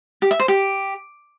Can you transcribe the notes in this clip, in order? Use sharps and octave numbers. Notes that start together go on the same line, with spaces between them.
G4
E5
C5
G4